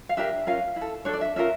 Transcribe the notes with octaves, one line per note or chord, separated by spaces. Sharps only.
F5
D4 G4 A#4 E5
C#4 F4 A#4 F5
E4
A4
D4 A4 C#5
D5
E5
C#4 F4 A#4 E5